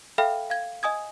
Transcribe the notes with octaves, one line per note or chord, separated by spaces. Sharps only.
A4 E5 F5 G5 B5 F6
F5 G#6
D#5 G#5 D#6 G#6